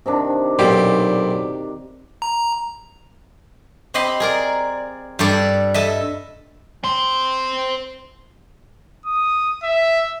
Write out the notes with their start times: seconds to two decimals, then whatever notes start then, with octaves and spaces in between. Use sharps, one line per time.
0.06 C3 D#3 D4
0.59 B1 A#2 G4
2.22 A#5
3.94 C4 G4 D#5 B5 C6
4.20 G#4 A#4 D5
5.19 G2 G3 A4 D5
5.74 A4 D#5 E5
6.84 C4 C5
9.06 D#6
9.63 E5